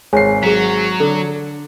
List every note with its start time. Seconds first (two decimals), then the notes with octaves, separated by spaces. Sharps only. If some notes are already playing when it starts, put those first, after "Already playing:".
0.13 G#1 G#4 C#5 G#5 C7
0.43 F#3 G#4 B6
1.00 D3 A4